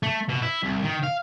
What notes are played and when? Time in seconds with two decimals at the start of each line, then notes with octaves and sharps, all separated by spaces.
0.03 A3
0.29 B2
0.42 E4
0.63 C2
0.83 D#3
1.04 F5